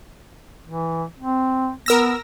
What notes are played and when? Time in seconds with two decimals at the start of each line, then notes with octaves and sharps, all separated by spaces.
0.67 E3
1.20 C4
1.86 B3 A#4 E6 A#6